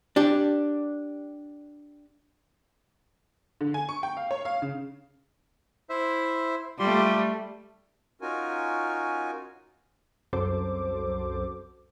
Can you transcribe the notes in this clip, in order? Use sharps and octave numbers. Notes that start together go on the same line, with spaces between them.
D4 G4
D3
G#5
C#6
G5
F5
C#5
F5
C#3
E4 C5 E5
G3 A3 F4 G4 C6
C#4 D#4 F4 F#4 A#4 G#5
C2 F#2 F#3 A4 C5 D6